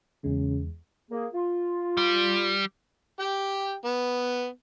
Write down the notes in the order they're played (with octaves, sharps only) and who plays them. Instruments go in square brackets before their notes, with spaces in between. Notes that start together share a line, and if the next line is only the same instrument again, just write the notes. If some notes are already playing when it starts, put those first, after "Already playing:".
[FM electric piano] E2 G#3 [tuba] C#3
[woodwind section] A#3 G#4
F4
[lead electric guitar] G3
[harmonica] G4 G5
B3